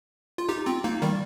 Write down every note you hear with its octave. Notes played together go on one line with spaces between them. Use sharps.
F4
D#4 G4
C4 F4
A#3 D#4
D#3 G3